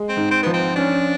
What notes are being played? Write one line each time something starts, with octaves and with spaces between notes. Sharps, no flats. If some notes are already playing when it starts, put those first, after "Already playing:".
Already playing: G#3
C4
G#2
C4
F3 B3
C4
C#4 D4